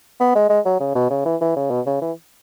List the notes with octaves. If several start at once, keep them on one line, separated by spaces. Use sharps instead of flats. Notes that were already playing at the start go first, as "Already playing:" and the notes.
B3
G#3
G#3
F#3
C#3
B2
C#3
E3
E3
C#3
B2
C#3
E3